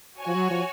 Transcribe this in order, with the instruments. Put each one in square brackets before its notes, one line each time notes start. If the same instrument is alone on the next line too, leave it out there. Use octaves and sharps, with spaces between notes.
[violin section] F#4 C#5 G#5
[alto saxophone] F3
F#3
F3